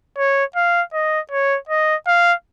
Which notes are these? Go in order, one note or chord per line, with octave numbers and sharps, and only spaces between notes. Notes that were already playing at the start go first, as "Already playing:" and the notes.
C#5
F5
D#5
C#5
D#5
F5